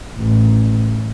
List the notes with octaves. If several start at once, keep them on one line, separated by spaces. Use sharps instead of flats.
A1